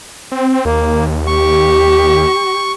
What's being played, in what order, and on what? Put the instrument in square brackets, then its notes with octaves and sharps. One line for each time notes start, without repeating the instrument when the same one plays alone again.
[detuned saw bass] C4
[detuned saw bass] D#2 [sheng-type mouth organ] A#3
[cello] G4 [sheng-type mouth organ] C#6